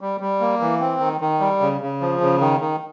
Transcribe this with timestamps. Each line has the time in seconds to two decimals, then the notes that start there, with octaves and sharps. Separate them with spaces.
0.01 G3
0.20 G3
0.40 A#3
0.60 E3
0.80 C4
1.00 D#3
1.21 D#3
1.40 G3
1.60 C#3
1.81 C#3
2.01 F3
2.21 C#3
2.40 D#3
2.61 D#3